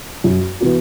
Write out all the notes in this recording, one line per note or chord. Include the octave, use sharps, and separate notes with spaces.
F#2
E3 B3 F#4